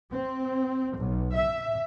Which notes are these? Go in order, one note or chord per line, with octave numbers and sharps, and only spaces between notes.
C4
B1
E5